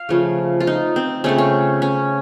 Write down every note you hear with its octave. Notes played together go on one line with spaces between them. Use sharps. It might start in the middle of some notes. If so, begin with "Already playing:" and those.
Already playing: F5
C#3 F3 A3
F4
D#4
C4
C#3 A3 C4 C#4
C#4
C#4